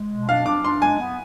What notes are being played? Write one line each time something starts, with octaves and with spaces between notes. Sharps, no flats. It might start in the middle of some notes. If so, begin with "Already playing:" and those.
Already playing: G#3
B2
D4 F5
D4 D6
D4 C6
G#3 G#5
B3